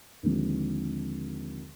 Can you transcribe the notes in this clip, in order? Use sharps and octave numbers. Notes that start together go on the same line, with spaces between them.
D#2 D3 F3 G#3 C4